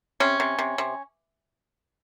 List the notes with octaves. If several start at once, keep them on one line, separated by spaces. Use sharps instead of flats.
C3 C#4
C3
C3
C3